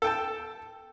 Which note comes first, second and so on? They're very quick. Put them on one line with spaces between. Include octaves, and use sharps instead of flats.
A4 G5 A5